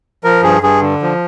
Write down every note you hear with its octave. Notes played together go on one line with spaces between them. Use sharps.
F3 A#4
G2 G#4
G2 G#4
D3
F3